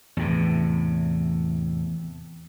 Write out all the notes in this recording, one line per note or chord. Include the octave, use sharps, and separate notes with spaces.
E2 A2 C3